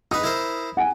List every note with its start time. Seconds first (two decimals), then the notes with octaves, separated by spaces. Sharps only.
0.11 D#4 B4 D#6
0.24 E4 A#4 C5
0.77 F#5 G#5